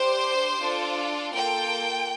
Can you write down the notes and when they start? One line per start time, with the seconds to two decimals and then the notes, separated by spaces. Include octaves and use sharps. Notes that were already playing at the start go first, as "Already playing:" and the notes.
Already playing: D4 G4 C5
0.60 D4 F4 A4
1.33 A#3 F4 A4 G5